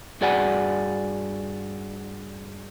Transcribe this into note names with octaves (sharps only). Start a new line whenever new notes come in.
G2 F#4 G#4 D5 F#5 G#5